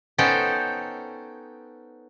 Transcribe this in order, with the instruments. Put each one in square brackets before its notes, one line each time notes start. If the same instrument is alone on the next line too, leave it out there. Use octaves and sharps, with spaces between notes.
[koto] B3 C#4 D#4 A4 C5 G5